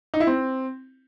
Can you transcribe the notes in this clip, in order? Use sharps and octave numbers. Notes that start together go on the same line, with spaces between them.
D#4
E4
C4